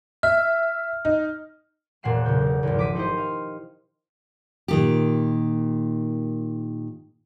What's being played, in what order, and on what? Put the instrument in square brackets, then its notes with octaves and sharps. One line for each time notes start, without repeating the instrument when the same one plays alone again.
[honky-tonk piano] E5 [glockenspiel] F6
[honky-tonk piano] D#4
[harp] E1 A#2 A3 F#5 C7 E7
B1 E2 C#3 G6
G#1 E2
F3 D6 B6 D#7
D#4 E4 G4 C5 D#5
F5
[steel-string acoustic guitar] A#2 D#3 G4